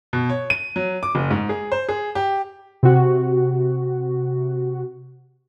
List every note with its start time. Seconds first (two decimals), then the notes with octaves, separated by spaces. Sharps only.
0.13 B2
0.29 C#5
0.50 D#7
0.76 F#3
1.03 D6
1.15 F#1
1.31 G#2
1.49 G#4
1.72 C5
1.89 G#4
2.15 G4
2.83 C3 F#4